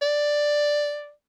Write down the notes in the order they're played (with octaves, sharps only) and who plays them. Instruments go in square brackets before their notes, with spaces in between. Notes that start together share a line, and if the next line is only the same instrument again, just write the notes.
[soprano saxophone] D5